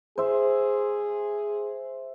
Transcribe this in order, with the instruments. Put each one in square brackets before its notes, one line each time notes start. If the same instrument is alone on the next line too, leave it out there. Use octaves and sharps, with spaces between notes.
[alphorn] G#4 [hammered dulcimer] C5 E5